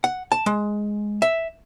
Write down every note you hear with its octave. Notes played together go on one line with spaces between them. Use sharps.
F#5
A5
G#3
E5